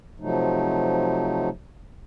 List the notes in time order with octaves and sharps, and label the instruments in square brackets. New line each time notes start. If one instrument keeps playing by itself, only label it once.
[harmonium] C3 F3 F#3 A3 D#4